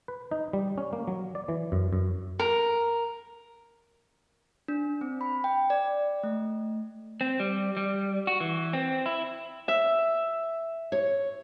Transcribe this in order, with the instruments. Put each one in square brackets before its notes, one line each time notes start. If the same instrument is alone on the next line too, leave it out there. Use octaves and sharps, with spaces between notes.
[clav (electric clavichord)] B4
D#4
G3
C#4
A#3
F#3
D5
E3
F#2
F#2
[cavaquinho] A#4
[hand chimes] D4
C4
B5
G5
D5
A3
[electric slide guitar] C4
G3
G3
F#4
E3
C4
E4
[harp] E5
[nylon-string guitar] C#5